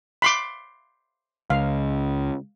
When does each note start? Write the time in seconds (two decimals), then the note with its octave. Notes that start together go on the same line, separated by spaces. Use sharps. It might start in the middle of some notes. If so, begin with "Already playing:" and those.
0.22 B5 C6 D6
1.50 C#2 F5